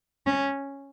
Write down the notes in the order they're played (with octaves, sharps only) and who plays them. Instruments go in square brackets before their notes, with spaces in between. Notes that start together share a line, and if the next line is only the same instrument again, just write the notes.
[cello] C#4